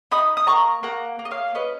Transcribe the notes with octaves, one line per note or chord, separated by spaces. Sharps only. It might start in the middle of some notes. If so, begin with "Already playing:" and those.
D#4 B5 D#6
D#6
A#3 A#5 C#6
A#3 F#5 A#5
A#3
D#5
C#5 F5
C#4 B4 D#5